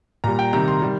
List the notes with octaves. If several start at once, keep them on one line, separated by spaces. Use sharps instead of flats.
A#2 G3 A#5
G5
C3 D#3 G3 A#5
C6
D#3 G3